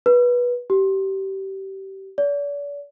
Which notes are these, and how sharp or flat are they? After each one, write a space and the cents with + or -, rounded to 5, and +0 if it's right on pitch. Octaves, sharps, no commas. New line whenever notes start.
B4 -20
G4 -25
D5 -40